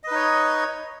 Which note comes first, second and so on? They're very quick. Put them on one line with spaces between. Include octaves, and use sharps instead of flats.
D#5 B4 D#4 C#5